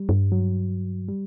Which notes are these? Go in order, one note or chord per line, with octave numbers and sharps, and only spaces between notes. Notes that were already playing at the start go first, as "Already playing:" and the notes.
Already playing: G3
F#2
G2
F#3
G3